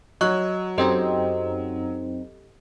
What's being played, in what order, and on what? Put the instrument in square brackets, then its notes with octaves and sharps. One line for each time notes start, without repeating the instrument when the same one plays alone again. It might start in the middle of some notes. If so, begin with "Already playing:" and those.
[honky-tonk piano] F#3 [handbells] D#5 C#6 F#6
[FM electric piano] F#2 C4 D#4 [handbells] G4 A4 D#5